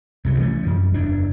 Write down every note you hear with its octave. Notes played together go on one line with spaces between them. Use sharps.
C2 C#3 F#3
E3 A3 C#4
F#2 F3
F#1 E2 D4